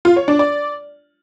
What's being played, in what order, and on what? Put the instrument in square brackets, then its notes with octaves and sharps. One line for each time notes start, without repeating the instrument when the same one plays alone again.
[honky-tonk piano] F4
C#5
D4
D5